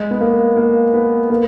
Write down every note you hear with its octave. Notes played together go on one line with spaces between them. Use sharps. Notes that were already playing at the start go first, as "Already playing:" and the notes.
Already playing: G#3
B3
A#3
A#3
B3
A#3